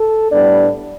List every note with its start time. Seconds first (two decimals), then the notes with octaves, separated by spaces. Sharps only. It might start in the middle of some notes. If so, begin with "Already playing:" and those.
Already playing: A4
0.31 A2 G3 B3 D4 D5